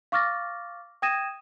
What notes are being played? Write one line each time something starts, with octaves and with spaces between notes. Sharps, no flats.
F5 C#6 D6 F6 A6 A#6
G5 D#6 G#6 A#6 D#7 E7